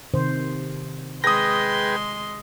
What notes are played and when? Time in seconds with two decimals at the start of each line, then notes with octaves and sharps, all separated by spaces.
0.14 C3 D#3 C5
1.24 G#3 G#4 B4 G5 C6 D#6 A#6